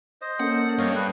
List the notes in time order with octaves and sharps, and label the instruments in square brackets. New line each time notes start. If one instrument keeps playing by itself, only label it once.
[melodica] C5 D#5
[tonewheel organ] A#3 C#4 [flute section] A4 G6 [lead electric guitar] F#5
[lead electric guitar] G2 [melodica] C#5 D#5 F5
[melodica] B4